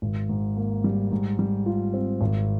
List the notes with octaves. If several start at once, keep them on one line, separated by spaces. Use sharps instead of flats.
G#1
G#2
A#3
G3
G#2
G3
F4
C4
G#1